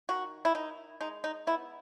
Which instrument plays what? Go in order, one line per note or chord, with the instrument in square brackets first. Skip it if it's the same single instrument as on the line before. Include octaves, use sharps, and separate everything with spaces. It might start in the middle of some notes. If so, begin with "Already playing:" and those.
[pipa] D#3 F#4
E4
D#3 D#4
G#3 D#4
D#4
B3 E4